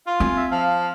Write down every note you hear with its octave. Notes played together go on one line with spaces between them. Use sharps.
F4 F5
C4 G#5
E5
F3 F5